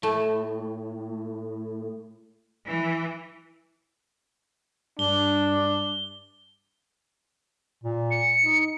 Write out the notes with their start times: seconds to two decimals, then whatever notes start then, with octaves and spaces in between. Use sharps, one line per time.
0.03 A2 A3
2.67 E3
4.99 G2 D4 G7
7.84 A#2
8.11 C#7
8.44 D#4